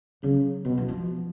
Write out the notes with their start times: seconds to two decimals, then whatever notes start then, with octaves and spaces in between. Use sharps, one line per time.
0.23 C#3 F#3
0.65 B2 F3
0.78 E3
0.88 F3